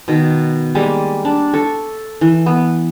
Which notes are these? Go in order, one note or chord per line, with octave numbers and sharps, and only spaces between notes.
B2 D#3
G3 G#3 A#3
D4
A4 C#6
E3
B3